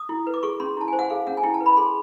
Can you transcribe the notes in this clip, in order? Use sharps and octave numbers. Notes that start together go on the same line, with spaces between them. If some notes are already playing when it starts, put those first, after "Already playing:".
Already playing: D#6
E4
B4
D6
G#4 C#6
C#4 C6
E4 A5
C5 G#5
F#5
G#4 F5
C#4 F#5
G#5
E4 G5
A5
B4
B5
G#4 C6